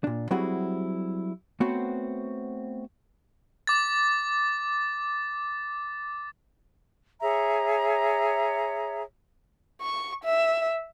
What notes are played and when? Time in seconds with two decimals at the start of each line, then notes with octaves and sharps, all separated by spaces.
0.04 A#2 D4
0.31 F#3 G3 C4 E4 F#4 G#4
1.60 A3 B3 C4 F#4 C5 C#5
3.67 D6 A6
7.21 G#4 C#5 E5 A#5
9.81 C#6
10.24 E5